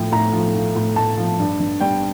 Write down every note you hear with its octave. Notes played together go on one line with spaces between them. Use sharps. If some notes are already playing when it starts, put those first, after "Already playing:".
Already playing: A2 F3 G5
A2 A#5
F3
F3
A2
A2 A5
F3
G2
G2
G3 G5